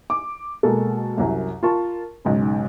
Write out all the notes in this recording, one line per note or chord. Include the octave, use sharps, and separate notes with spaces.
D6
B2 G#3 A#3 A4
C2 F#2
F4 A#4 A5 C#6
B1 G#2 C#3